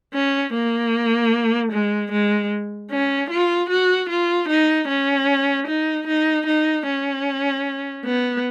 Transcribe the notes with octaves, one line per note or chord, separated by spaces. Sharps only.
C#4
A#3
G#3
G#3
C#4
F4
F#4
F4
D#4
C#4
D#4
D#4
D#4
C#4
B3